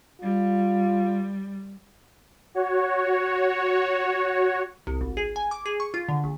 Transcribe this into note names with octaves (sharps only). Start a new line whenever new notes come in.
G3 F4
F#4 C#5
C2
G#1
G#4
G#5
D6
G#4
C#6
F4
D3
A#1